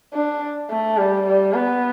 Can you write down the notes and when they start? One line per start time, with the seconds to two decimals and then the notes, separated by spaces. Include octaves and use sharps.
0.13 D4
0.70 A3
0.97 G3
1.26 G3
1.54 B3